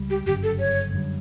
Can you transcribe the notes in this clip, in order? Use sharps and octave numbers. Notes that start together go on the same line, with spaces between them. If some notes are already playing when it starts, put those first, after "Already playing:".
Already playing: C#2 G3
G4
G1 F#2 C#3 G4
A4
C#5
F#2 D3 G3